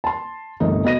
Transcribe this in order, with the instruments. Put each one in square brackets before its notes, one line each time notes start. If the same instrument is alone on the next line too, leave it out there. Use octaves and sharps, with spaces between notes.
[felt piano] A5 C6
G1 C2 A3 D#4
B2 B3 D#5 A#6 D#7